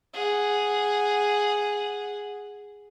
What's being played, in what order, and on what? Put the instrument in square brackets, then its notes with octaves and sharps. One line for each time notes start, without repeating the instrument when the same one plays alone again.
[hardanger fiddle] G#4 F#5